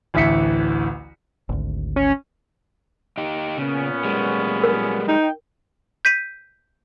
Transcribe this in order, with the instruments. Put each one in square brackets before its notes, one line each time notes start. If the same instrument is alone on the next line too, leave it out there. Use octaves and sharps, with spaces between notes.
[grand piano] A1 D2 E3 E5 B6 C#7
[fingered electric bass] G#1 D2
[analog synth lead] C#4
[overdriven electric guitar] D#4 G4
[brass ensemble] A#2 B3 C#4 [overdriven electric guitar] C#3
[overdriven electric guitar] G3 G#3
[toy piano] A#4
[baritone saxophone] D#4 [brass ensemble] G5
[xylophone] G6 B6 D#7